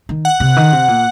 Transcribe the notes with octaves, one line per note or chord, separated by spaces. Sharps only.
D#3
F#5
C3
D#3
C3
A#2